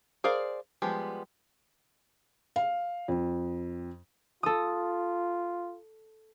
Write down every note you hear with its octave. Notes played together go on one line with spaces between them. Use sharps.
G#4 A#4 C5 D5 F5
F3 G3 G#3 B3 G4
F5
F2
F4 A4 D#6